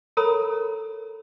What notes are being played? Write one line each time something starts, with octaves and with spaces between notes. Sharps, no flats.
A4 A#4 C#5 A#5 B5 D#6